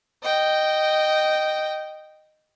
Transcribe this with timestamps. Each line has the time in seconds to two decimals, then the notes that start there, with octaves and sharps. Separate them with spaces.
0.23 D#5 G5